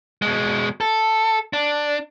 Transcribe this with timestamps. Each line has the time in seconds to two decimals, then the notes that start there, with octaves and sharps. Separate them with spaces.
0.22 B2 G#3
0.81 A4
1.53 D4